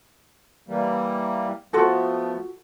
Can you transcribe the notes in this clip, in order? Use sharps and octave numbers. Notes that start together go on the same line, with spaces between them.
E3 G3 A#3
F3 A3 B3 F4 F#4 A4